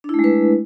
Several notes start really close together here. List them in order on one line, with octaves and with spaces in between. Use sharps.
D4 E4 A3 G#3 B4